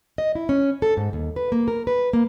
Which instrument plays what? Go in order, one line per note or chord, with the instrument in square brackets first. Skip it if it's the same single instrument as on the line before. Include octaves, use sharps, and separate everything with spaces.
[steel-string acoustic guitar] D#5
E4
C#4
A4
G#2
D#2
B4
A#3
A#4
B4
A#3